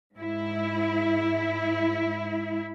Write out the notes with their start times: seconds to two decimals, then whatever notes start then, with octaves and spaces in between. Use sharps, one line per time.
0.15 G#2 E4